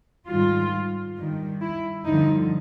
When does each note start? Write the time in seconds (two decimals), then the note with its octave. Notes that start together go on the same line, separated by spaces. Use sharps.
0.28 G#2 D#3 G3 F4
1.18 G2 D#3 G3
1.62 E4
2.06 G2 D3 F3 D#4